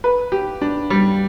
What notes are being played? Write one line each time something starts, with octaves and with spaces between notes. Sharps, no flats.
B4
G4
D4
G3